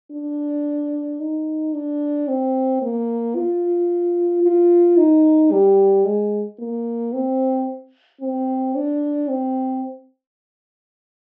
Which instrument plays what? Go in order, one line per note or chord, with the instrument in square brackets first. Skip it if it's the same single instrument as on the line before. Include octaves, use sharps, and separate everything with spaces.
[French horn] D4
D#4
D4
C4
A#3
F4
F4
D#4
G3
G#3
A#3
C4
C4
D4
C4